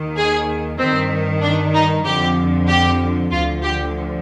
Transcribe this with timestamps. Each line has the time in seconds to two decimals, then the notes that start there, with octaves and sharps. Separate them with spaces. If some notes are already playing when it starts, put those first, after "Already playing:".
Already playing: D#2 D#3
0.17 G#4
0.78 G2 D#3 C4
1.42 D4
1.74 D#4
2.05 F2 D3 F3 G4
2.68 G4
3.31 D2 D3 F3 F4
3.62 G4